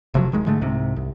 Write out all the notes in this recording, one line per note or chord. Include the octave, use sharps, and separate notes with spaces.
F1 C3 F3 F#3
D1 D#3 G#3
G#2 D3 G#3 A3
C2 G#2 C3
C2